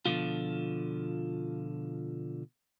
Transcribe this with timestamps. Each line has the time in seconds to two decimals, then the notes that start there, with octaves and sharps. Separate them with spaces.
0.06 B2 D3 E3 F3 F4